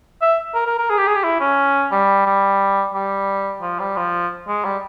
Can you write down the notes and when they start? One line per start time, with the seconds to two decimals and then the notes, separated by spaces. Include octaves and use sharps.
0.22 E5
0.55 A#4
0.67 A#4
0.78 A#4
0.90 G#4
0.98 G4
1.07 G#4
1.16 G4
1.24 E4
1.40 C#4
1.92 G3
2.26 G3
2.94 G3
3.62 F3
3.80 G3
3.97 F3
4.48 G#3
4.65 G3